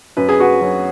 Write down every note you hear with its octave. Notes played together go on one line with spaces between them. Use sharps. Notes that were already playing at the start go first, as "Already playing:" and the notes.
F#2 B4
G#4
F#4 B4
F#3 C#4